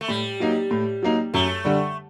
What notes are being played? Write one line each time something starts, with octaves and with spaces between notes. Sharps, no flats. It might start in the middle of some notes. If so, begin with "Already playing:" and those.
A3
A2 G3
F#3 A#3 D#4
A2
F#3 A#3 D#4
F#2 A3
D3 G3